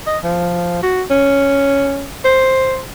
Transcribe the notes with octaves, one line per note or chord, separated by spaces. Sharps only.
D#5
F3
F#4
C#4
C5